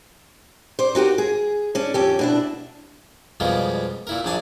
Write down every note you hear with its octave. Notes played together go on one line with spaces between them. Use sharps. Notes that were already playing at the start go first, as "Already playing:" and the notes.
C5 D5
D#4 F#4 G4 A#4
G#4
C#4 D4
F2 C#4 G4
B2 D4 E4
F2 B2 G3 G#3 F4 A#4
A#2 E4 A#4
A#1 F#2 A#2 D4 G#5 A5